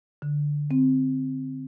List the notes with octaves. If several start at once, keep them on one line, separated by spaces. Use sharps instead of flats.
D3
C4